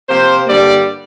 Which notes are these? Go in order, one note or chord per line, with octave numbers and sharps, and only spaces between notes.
C3 F3 A#3 C5
G2 D3 G3 A#3 D5